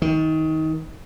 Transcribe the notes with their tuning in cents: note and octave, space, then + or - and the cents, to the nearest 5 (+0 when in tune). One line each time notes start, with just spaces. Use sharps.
D#3 +25